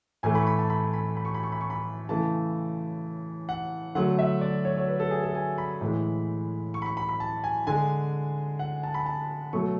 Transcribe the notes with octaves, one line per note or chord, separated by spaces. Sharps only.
A2 E3 A3 G#5
B5
C#6
B5
A5
B5
B5
B5
C#6
B5
C#6
B5
C#6
B5
C#3 E3 A3 A5
F#5
D3 F#3 A3 F#5
E5
D5
C#5
C#5
B4
A4
G#4
A4
G#5
B5
A2 E3 G#3
C#6
B5
C#6
B5
B5
A5
G#5
D3 G#3 G#5
F#5
A5
B5
A5
B2 F#3 A3 C#6